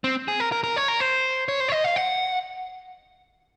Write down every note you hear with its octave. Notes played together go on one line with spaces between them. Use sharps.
C4
G#4
A#4
A#4
A#4
C#5
A#4
C5
C#5
C5
C#5
D#5
F5
F#5